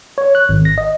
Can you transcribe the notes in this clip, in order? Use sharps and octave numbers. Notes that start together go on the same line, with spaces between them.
C#5
F#6
G#1
A#6
D#5